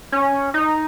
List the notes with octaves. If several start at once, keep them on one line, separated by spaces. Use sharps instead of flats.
C#4
D#4